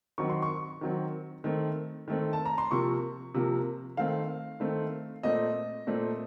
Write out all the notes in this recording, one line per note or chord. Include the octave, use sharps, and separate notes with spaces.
D#3 F#3 C4 C#6
C6
C#6
D#3 F#3 C4
D#3 A3 C4
D#3 A3 C4
A5
A#5
C6
C3 F3 A#3 C#6
C3 F3 A#3
D#3 A3 C4 F5
D#3 A3 C4
A#2 A3 C4 D#5
A#2 A3 C4